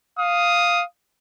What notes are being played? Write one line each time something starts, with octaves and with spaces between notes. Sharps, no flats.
F5 D#6